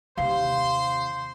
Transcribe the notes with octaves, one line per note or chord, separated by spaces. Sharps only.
D#2 C3 C5 F5 C6